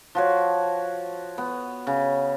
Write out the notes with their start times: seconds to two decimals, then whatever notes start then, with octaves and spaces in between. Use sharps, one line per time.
0.15 F3 F#4 C#5
1.38 B3
1.87 C#3